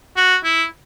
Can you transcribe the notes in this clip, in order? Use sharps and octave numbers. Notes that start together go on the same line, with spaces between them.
F#4
E4